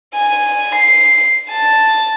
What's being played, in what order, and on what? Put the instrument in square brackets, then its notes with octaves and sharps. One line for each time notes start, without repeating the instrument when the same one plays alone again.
[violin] G#5
C7
A5